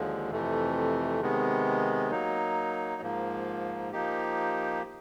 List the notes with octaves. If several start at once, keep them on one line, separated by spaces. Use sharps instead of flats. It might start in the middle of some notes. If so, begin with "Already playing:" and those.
Already playing: D#2 D3 F3 G#3
F2 C3 E3 A3
C3 D#3 G#3 B3
F#3 A#3 D#4
G#2 F3 A#3
F3 A#3 D#4 G4